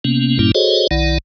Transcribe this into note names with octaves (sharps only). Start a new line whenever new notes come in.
C3 A#3 B3 C#4
G2 A#2 G3 A#3 C#4 E4
F#4 G#4 A4 C5 C#5 D#5
B1 D#3 E4 D5 F#5